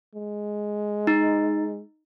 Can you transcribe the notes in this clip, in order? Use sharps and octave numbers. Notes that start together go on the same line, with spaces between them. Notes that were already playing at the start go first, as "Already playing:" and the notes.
G#3
D#4